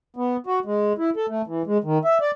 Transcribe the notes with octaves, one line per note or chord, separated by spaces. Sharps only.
B3
F#4
G#3
E4
A4
A3
E3
G#3
D#3
E5
D5